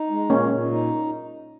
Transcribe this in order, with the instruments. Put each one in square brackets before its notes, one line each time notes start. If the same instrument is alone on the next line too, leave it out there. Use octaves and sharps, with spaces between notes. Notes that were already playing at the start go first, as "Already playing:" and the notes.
Already playing: [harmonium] D#4
G#3
[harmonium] A#2 [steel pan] A#3 C#4
[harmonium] A#2
D#4